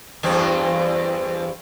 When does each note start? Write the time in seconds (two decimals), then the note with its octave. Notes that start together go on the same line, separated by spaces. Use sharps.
0.23 E2 G2 C4